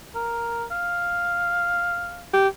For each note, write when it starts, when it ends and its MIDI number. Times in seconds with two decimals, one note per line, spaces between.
0.15 0.65 70
0.71 2.30 77
2.34 2.48 67